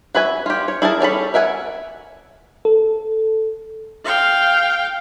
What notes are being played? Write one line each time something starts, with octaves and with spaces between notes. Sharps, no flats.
F#4 B4 E5 G#5
F4 G4
C#5
E4 G#4 A#4 A5
G3 C#4 A4 B5
A#4 E5 F#5 G#5
A4
F5 G5